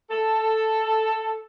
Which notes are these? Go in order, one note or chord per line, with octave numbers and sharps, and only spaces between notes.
A4